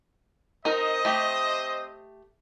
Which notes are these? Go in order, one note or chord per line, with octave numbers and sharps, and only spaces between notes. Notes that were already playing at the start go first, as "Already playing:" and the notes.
C4 D#4 A#4 C5 D#5
A3 G4